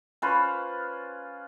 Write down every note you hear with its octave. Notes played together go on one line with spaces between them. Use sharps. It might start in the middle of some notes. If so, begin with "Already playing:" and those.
C#4 F4 B4 C5